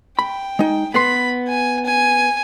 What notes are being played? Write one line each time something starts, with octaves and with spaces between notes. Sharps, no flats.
G5 B5
G#3 D#4
B3 B4 B5 C6
G#5
G#5